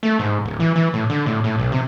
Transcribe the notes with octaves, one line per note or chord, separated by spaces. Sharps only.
A3
G#2
D1
E3
E3
A2
D3
A2
A2
B1
C3